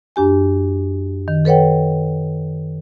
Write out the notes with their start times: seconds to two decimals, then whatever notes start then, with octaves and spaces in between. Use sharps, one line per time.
0.16 F#2 D4 G4 G#5
1.28 D#3
1.45 A4 B4 C#5 F#5 G5